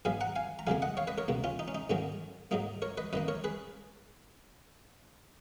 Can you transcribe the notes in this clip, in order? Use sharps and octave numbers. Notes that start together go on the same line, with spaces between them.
G#2 F#3 B3 F5 G#5
F#5 A#5
F5 G#5
A#5
F2 C#3 F#3 A#3 F5 G#5
D#5 F#5
C#5 F5
B4 D#5
A#4 C#5
C#2 B2 A#3
C#4 F4
D#4
C#4
D#4
G#2 D#3 F#3 A#3 C#4
G#2 F#3 A#3 D#4
A#4 C#5
B4 D#5
F#2 D#3 A#3 B4 D#5
A#4 C#5
G#4 B4